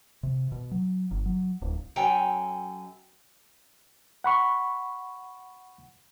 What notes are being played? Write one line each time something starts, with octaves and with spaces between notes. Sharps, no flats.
C3
B2
F#3
G1
F#3
D1
F#2 A4 G5 G#5 A#5
F#5 B5 C#6